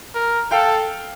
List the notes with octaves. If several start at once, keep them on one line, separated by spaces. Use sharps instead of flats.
A#4
A4 F5 G5